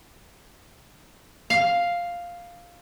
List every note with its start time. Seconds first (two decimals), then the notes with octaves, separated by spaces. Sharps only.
1.50 F5